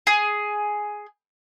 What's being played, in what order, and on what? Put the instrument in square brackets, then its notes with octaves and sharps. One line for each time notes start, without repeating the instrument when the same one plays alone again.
[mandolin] G#4